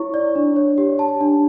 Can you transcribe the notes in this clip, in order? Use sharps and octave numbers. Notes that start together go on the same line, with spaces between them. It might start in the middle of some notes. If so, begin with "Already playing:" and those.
Already playing: E4 C#5 C#6
D5
D4
C#5
G4
A5
D4